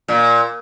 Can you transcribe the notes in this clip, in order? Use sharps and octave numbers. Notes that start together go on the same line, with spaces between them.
A#2